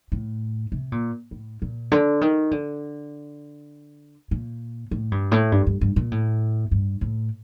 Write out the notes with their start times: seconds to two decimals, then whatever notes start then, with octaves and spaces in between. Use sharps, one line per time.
0.12 A2
0.72 C3
0.92 A#2
1.31 A2
1.62 A#2
1.92 D3
2.21 D#3
2.51 D3
4.31 A#2
4.91 A2
5.12 G2
5.31 A2
5.52 G2
5.67 G2
5.81 G2
5.96 A#2
6.11 A2
6.71 G2
7.01 A2